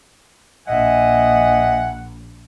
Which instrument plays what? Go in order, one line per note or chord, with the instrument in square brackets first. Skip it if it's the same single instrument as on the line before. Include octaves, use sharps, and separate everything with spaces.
[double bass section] A#1 [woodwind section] D#5 E5 G#5 [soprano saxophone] F#5